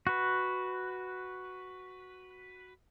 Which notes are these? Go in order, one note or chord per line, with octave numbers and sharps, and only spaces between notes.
F#4 B4